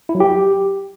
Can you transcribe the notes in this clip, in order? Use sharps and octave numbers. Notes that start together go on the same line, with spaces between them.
E4
F#3
G4